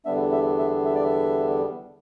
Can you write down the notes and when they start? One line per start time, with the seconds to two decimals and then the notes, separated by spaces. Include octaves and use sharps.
0.05 E2 D3 G3 B3 D4 E5
0.32 E5
0.59 E5
0.85 E5
0.95 D5
1.04 E5